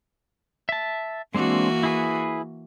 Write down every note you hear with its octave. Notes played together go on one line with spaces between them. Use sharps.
E5 A5
E3 G#3 A#3 C4 D4 F#4
E4 G#4 B4